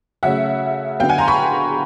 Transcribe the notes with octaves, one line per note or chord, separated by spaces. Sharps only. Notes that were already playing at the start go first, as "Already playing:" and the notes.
C#3 F#3 A3 C#4 E5 F#5
D3 F#3 B3 F5 G5
F#5 G#5
A#5 C6
B5 C#6